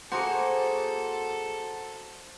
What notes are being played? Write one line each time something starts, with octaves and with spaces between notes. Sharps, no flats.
A#3 F#4 G#4 A4 C5 F#5 A#5